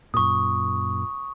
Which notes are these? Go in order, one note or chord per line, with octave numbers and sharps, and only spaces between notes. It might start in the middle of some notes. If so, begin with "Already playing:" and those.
F#2 A#2 C#6 D#6